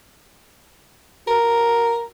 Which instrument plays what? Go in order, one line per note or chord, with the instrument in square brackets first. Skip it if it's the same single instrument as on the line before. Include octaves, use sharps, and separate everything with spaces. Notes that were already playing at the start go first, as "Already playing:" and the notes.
[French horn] F#4 [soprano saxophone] A#4